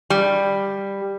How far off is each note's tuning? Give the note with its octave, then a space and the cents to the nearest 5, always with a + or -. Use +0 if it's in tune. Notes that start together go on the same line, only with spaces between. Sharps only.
G3 +10